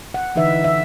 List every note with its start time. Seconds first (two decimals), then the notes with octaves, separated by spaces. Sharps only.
0.14 F#5
0.35 D3 E3 D#4 B4 E5
0.64 E5